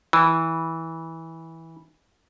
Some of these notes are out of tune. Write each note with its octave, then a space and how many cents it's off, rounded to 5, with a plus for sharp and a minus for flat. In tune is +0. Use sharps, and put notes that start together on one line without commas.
E3 -15